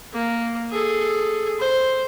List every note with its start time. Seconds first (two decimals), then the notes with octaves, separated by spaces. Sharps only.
0.13 A#3
0.71 G#4 A4
1.60 C5